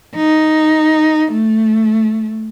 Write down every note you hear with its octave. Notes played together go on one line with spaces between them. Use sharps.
D#4
A3